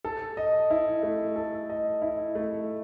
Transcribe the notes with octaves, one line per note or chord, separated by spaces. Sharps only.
A4
D#5
E4
A3
A4
D#5
E4
A3